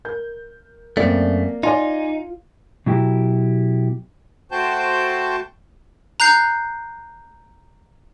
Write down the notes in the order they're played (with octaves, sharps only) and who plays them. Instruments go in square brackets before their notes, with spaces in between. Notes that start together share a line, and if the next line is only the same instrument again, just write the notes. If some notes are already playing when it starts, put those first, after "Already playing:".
[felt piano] A#4 G6
[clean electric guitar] F#2 A3 [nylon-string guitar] A#3 D5 [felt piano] C4
[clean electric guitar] D#4 [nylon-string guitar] F4 [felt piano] D5 G#5 C6
[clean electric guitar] B2 F#3 E4 G4
[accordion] A3 F#4 C5 G5 A5 G6
[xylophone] A#5 F#6 G6 C7